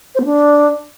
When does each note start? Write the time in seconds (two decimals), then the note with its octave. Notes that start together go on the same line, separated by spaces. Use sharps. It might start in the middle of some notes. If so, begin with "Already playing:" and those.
0.15 C5
0.20 B3
0.25 D4